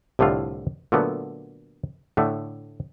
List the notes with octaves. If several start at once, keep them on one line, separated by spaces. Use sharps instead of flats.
C2 A2 D3 A3 F4
A#2 D3 F#3 A3 B3
A2 D3 A3